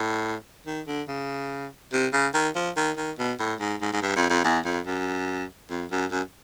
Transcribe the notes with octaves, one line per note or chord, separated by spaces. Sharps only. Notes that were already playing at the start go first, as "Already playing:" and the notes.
Already playing: A2
D#3
D3
C#3
C3
C#3
D#3
F3
D#3
D#3
B2
A2
G#2
G#2
G#2
G2
F2
F2
E2
F2
F#2
F2
F#2
F#2